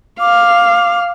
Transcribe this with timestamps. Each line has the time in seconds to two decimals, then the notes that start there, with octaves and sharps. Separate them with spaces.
0.20 F5 D6